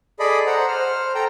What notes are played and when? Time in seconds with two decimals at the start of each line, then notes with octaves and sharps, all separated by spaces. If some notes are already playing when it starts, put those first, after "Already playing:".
0.19 G#4 A4 D5 D#5 B5
0.46 C5 F#5 A#5
0.68 C5 F6
1.15 A4 G5 A#5